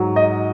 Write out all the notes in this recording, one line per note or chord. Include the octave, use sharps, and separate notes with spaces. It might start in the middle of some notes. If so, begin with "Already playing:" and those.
Already playing: G#2 F#3
D#5